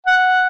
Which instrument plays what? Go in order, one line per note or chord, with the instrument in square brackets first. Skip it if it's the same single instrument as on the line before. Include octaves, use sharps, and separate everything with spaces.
[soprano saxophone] F#5